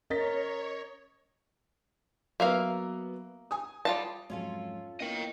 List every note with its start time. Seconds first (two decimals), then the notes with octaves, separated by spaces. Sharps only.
0.10 C#4 A#4 C#5 D#5 A6 B6
2.40 F#3 A#3 B3 E5 F5
3.51 G#5 D#6
3.85 G3 F4 A5
4.30 F2 G#2 F#3 C#4 F4 A4
5.00 A#3 B3 E4 D#5 G5